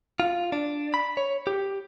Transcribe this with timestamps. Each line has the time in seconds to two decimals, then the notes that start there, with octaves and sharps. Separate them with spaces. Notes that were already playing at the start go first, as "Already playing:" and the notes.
0.20 F4
0.52 D4
0.94 B5
1.17 C#5
1.47 G4